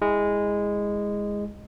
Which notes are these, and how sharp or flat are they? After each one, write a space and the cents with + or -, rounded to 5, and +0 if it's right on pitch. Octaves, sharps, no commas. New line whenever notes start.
G#3 -15 E4 -20